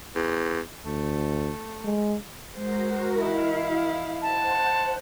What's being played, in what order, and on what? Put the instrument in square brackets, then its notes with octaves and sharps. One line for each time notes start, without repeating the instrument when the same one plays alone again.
[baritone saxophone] E2
[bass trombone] D2 [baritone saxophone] A3
[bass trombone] G#3
[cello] G#3 C5 [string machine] F#4 A#4
[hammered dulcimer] E3 D#4 [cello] E4 [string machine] F5
[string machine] C5 F#5 [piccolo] A5